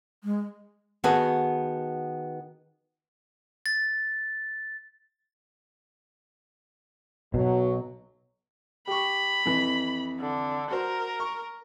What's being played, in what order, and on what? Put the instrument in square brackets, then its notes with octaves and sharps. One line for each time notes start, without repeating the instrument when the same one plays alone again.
[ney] G#3
[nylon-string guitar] D#3 B3 F#4 G#4 A4 B4
[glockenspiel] A6
[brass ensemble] B1 F#3 [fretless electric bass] B2
[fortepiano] G4 C#6 [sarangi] B5
[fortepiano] F2 E3
[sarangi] D3
[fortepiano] F#4 C5 [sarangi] A#4
[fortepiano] C#6